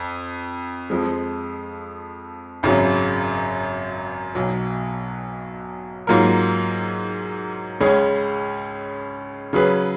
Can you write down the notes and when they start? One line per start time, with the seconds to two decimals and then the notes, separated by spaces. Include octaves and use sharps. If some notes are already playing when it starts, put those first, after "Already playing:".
Already playing: F2
0.90 F2 F3 G#3
2.63 G#1 F#2 C#3 F#3
4.35 B1 B2 F#3
6.07 G#2 F#3 A#3 F4 A#4
7.80 C#2 C#3 G#3 C#4 G#4
9.53 C#3 F#3 C#4 G#4 B4